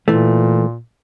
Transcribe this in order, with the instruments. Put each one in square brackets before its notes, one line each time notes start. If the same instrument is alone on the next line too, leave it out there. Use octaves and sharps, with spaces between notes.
[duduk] A#2 [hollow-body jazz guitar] E3 A3